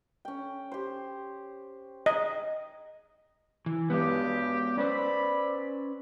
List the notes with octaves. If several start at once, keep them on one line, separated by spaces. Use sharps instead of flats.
C#4 G5
G4 C5
D#5
E3
G2 F#3 G#3 B3 G4
C#4 B4 C5 D5 B5